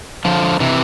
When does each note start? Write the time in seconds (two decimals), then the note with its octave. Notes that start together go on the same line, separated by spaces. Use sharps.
0.25 D3 F3
0.60 C3 E3